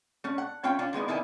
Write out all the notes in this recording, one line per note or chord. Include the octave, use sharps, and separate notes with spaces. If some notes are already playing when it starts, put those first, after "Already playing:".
A3 C#4
F#5
A3 C#4 F4 C#5 G5
C#4 D4 F4
D#3 G#3 B3 E4
D3 D#3 B3 E4 G#5